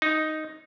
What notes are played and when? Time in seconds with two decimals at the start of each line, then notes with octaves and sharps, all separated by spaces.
0.02 D#4